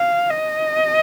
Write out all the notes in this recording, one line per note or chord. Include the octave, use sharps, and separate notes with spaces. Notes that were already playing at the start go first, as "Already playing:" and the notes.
Already playing: F5
D#5